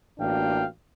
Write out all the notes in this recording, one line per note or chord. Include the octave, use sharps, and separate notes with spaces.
A1 A#3 D4 F#4 F5 G5